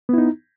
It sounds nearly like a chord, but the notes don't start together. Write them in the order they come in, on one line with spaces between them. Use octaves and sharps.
B3 E4 D#4